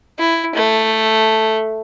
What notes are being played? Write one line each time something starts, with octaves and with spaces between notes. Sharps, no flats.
E4
A3